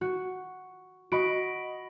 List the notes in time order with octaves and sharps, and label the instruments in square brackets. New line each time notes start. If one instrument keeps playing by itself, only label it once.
[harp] F#4
[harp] F#4 [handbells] D#5 B5 D7